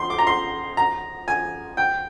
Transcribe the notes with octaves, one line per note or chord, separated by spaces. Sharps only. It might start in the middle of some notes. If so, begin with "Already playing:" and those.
Already playing: C6
D6
A#5
C6
A#5
G#5
G5